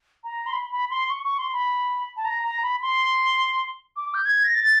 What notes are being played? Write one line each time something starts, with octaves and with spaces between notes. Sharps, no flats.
A#5
C6
B5
B5
C6
C#6
C#6
C6
B5
A5
A#5
A#5
B5
C6
D6
G6
G#6
A#6
A6